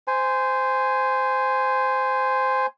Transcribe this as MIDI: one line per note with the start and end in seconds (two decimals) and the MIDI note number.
0.08 2.66 72
0.08 2.66 80